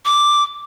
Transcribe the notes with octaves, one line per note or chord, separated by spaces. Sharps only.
D6